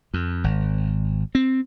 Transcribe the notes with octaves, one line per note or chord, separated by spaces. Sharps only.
F2
G#1
C4